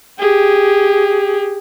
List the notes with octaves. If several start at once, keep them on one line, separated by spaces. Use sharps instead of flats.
G4 G#4